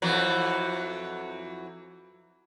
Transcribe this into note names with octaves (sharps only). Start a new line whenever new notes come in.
F2 E3 F#3